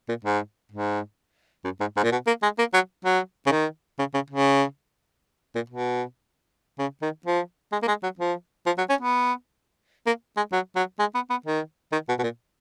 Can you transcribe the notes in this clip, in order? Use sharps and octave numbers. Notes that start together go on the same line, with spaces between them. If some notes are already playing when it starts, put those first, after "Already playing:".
A#2
G#2
G#2
F#2
G#2
G#2
A#2
B2
A#3
G#3
A#3
F#3
F#3
C#3
D#3
C#3
C#3
C#3
A#2
B2
C#3
D#3
F3
G#3
A#3
G#3
F#3
F3
F3
F#3
C#4
B3
A#3
G#3
F#3
F#3
G#3
B3
B3
D#3
D#3
B2
B2
A#2